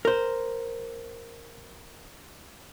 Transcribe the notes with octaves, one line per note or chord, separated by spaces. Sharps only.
A#4 C5